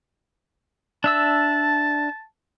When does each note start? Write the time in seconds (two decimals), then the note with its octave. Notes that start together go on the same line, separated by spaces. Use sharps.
1.04 D4 E5 A5 E6